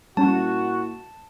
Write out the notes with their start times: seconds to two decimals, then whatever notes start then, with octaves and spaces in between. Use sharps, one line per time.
0.17 A#2 G3 C#4 E4 F#4 A5